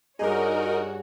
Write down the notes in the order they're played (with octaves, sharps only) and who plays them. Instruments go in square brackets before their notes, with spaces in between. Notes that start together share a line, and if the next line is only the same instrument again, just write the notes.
[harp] G2 G#4 [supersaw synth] D#4 A#4 [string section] F#4 C#5